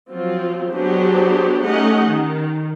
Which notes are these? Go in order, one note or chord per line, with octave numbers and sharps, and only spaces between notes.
F3 F#3 C4 F4
F#3 B3 D4 G4 G#4 C5
A3 C#4 D#4 G4 D#5 F#5
D#3